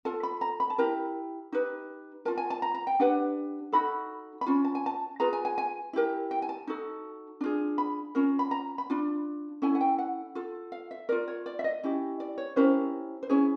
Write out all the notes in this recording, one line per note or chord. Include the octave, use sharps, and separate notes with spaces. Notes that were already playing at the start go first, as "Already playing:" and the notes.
F4 A4 A5
B5
A#5
B5
A5
E4 G4 A#4 A#5
D#4 G4 B4
F4 A#4 A5
G#5
A5
A#5
A#5
G5
D4 G4 B4 F#5
D#4 F#4 A4 B5
B5
C#4 F4
A5
G#5
A5
F4 G#4 B4 A#5
G#5
G#5
G#5
E4 G4 A#4
G5
G#5
A5
D#4 F#4 A4
D4 F4 G#4
B5
C#4 F4 A#4
B5
A#5
B5
D4 F4
C#4 E4 A4 G#5
F#5
G5
F#5
F4 A4
F5
E5
F4 A#4 D5
C#5
D5
E5
D#5
C#4 E4 G4
D5
C#5
C#4 E4 G4 A#4 C5
C5
C#4 E4 G#4 C#5